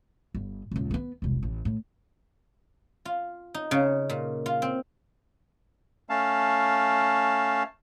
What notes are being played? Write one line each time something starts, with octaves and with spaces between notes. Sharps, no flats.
G1
D#1 C#2
A3 B3
E1 C2
A1
A2
F4
D#4
C#3
A#2
F4
C4
A3 C#4 F5 A5